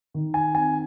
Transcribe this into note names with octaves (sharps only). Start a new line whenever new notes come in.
D#3
G#5
C4 G#5